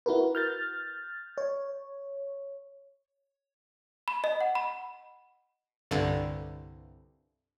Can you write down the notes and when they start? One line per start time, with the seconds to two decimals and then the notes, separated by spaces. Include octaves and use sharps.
0.06 E4 F#4 A#4 B4
0.35 F6 G6 A6
1.38 C#5
4.08 B5
4.24 D#5
4.41 F#5
4.55 B5
5.91 C2 G2 D3